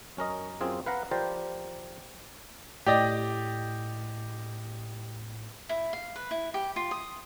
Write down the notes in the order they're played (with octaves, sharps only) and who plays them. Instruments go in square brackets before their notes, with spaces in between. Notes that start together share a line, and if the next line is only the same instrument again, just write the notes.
[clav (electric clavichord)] F#2 C#4 A#4 D#5
F#2 C4 F4 G#4
B4 F5 F#5 A#5
F3 G4 A#4 C5 D5
[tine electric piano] A2 [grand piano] G4 D5 D#5
[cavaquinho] E4
F5
B4
E4
G4
F4
D#6